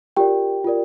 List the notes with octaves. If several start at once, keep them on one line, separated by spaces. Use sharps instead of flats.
F4 G4 A#4 D5 G5
F4 A#4 D5